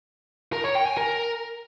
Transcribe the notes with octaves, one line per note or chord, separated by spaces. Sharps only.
A#4
C#5
G5
G#5
A#4